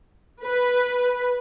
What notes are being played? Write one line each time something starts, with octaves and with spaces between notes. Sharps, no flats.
B4